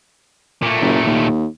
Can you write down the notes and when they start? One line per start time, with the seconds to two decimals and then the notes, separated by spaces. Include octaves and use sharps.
0.62 A#2 A3
0.82 F#1
1.06 D#2